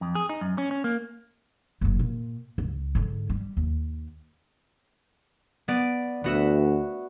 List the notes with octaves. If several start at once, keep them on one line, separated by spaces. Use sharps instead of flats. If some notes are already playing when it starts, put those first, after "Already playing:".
F2
G#4
D#4
F#2
C#4
C#4
A#3
F#1 C#3
A#2
C#2
G#2 D3
G3
D#2
B3 D5 D7
D2 B3 F#4 E5